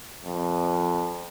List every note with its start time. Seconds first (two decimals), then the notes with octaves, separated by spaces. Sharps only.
0.25 F2